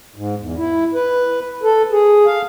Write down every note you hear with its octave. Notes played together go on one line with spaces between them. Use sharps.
G#2
E2
E4
B4
A4
G#4
F5